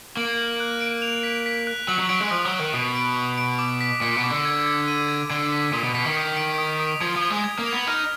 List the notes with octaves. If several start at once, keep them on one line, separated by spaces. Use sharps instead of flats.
A#3 F#7
F#7
F#6
D7
F7
B6
B6
F#6
F#3 F#7
F#3
F#3 D7
G#3
F3 D#6
F#3
F#6
D#3
B2 D#6
D7
D#6
D7
D6
B6
A#2 B6
B2
D6
D3
G#6
G#6
D#7
G#6
D3 G#6
B6
A#2 D#6
B2
B2 B6
D#3
D#6
D7
D#6
D#6
F3 G#6
F3
G#6
G#3
G#6
A#3
F7
B3
D#4 F6